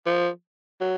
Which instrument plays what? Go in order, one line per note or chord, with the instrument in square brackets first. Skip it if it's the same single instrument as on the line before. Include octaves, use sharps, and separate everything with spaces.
[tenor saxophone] F3
F#3